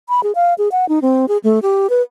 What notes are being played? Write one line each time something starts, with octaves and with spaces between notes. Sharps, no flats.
B5
G#4
F5
G#4
F#5
D#4
C4
G#4
A3
G4
B4